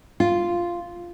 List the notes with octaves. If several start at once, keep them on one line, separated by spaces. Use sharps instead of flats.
F4